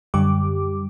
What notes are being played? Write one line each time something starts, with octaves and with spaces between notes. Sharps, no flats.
F#2 D3 G3 G4 D6